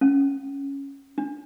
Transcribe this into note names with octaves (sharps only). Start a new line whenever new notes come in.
C#4
D4